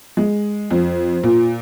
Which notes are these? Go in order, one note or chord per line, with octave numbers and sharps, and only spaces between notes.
G#3
F2
A#2